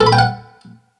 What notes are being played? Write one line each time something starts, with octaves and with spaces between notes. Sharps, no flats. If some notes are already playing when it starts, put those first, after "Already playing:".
A4
B5
G5
F#5